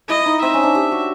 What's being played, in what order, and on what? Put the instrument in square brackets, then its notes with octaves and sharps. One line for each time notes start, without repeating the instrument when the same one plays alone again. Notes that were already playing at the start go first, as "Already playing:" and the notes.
[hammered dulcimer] E4 [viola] D#5
[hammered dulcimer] D#4
[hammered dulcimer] C4 [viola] E5
[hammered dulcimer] C#4
D4
G4
F#4